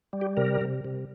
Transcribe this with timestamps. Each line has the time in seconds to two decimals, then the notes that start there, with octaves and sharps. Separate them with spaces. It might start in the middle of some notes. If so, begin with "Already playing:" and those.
0.13 G3
0.21 G4
0.37 C3 A#4
0.61 C3
0.85 C3